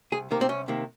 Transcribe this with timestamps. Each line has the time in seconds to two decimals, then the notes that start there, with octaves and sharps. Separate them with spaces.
0.12 C2 G#4
0.31 C3 D#3 A#3 A#4
0.41 C4
0.49 C2 C#4
0.68 C3 D#3 A#3